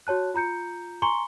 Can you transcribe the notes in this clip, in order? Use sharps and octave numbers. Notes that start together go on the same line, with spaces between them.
F#4 C#5 A5 F#6
F4 A#5 G6 C#7
G#5 A#5 C6 C#6 C#7 G7